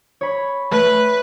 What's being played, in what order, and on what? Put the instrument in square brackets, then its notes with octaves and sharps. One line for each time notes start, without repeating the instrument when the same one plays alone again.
[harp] C#5 B5
[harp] A3 [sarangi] B4